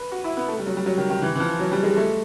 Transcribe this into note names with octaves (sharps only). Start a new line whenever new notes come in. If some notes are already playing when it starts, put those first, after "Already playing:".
Already playing: B4
F#4
E4
B3
A3
G3
F#3
G3
F#3
D#3
D#3
E3
E3
F3
F#3
G3
G#3
A3